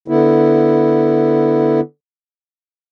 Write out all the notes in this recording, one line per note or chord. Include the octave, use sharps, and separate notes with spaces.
D3 B3 E4